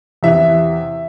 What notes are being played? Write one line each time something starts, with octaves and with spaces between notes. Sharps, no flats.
E2 C3 E3 E5